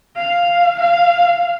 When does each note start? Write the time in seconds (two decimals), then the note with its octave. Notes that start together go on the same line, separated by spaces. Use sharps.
0.16 F5
0.79 F5